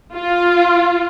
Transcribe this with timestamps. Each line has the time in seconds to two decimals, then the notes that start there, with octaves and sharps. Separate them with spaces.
0.14 F4